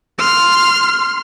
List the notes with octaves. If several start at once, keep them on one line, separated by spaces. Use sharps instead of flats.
C6 F6